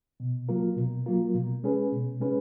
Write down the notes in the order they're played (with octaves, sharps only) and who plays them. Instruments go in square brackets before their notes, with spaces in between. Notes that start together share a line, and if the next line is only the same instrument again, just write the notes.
[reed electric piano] B2
F#3 A#3 F4 A#4
B2
F#3 A#3 F4 A#4
B2
G#3 C#4 G#4 B4
B2
G#3 C#4 G#4 B4